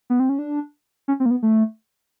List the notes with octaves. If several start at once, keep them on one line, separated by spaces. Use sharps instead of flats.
B3
C4
C#4
D4
C#4
C4
A#3
B3
A3